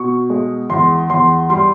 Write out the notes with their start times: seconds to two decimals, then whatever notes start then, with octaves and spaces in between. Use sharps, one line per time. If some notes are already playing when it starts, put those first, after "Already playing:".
Already playing: B2 C#6
0.30 G#3
0.70 E2 C6
1.10 E2 C6
1.50 G3 C6